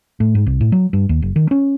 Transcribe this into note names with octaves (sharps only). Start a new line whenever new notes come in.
A2
G#2
C2
A2
F#3
G2
D#2
F#1
D#3
C#4